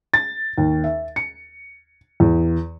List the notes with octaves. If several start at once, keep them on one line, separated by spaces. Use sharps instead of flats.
A6
D#2
E5
C#7
E2